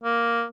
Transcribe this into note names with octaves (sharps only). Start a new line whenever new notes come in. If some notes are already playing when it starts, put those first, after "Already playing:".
A#3